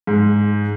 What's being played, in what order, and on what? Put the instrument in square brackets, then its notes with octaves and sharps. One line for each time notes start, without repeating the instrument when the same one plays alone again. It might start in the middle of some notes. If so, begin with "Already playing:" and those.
[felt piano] G#2